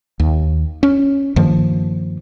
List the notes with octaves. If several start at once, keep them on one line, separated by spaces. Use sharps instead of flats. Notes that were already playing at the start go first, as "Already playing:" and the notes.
D#2
C#4
G2 D#3 F3 A#3